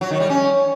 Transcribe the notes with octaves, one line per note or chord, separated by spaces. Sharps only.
F#3
D#3
G3
C#4